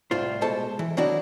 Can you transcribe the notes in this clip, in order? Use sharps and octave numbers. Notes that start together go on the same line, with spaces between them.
C2 A2 F4 C5
B2 G#3 A4 C5 A5
E3
D#3 F#3 D4 E4 F#4